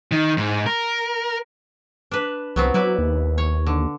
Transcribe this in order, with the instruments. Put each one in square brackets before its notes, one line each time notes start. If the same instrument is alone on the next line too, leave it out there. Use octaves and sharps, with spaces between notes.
[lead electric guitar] D#3
G#2
A#4
[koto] D4 B4
[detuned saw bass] C2 [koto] F#3 B3 C4
[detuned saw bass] F#3 [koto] E4 B4 D5
[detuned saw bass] D#2
[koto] C#5
D3